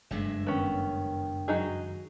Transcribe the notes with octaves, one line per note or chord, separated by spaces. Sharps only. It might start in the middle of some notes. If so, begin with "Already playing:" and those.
F#1 G2 G#3 A3 E5
D#3 B3 C#4
F#3 D#4 G#4